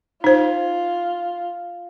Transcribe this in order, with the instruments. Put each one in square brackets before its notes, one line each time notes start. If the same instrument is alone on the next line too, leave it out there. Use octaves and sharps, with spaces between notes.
[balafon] D#4 C5 [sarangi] F4